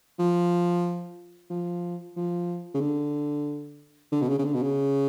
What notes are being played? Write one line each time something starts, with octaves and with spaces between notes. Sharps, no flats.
F3
F3
F3
C#3
D3
D3
B2
C#3
C#3
D3
B2
C#3